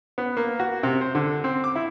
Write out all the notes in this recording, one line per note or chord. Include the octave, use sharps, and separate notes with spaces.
B3
A#3
F#4
C3
C5
D3
C4
D6
E4